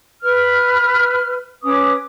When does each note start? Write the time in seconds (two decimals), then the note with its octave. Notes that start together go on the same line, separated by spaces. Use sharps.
0.22 B4 F6
1.63 C#4 B4 D6 D#6